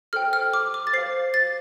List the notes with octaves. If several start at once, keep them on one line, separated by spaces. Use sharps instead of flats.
A4 C5 G5 F6
F6
D6
D6
A6
C5 F5 C7
A6